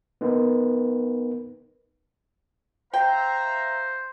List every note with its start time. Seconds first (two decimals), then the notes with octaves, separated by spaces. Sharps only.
0.21 B3 D#4 A#4 B4
2.94 C5 E5 F5 G5 A#5